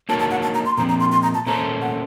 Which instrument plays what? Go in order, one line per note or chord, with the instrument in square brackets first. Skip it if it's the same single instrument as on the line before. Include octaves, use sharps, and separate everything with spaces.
[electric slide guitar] A#3 D#4 F#4 A#4 C#5 [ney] A5
[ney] A5
F#5
A5
A#5
C6
[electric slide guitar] A#2 F3 C4 [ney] A#5
[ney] A#5
C6
C6
A#5
A5
[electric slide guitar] A#2 A3 C#4 A4 C5 [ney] A#5
[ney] F#5